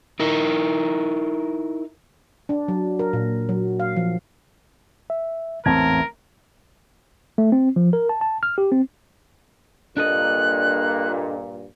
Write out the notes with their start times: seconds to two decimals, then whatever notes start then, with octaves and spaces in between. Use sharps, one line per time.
0.20 D#4 E4 A#4
2.49 D4
2.68 F#3
2.99 A#4
3.13 A#2
3.49 F#3
3.80 F5
3.96 F3
5.10 E5
5.66 A1 E2 G#2 C4 A#4 A5 G#6
7.38 A3
7.52 C4
7.76 F3
7.93 A#4
8.09 A5
8.21 A5
8.43 F6
8.58 G4
8.72 C4
9.97 G2 A#2 D4 A4 D#5 F#6